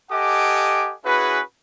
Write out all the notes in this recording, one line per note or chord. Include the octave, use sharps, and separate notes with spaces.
G4 A4 D#5 F#5 G#5 D6
C#4 E4 F#4 G#4 B4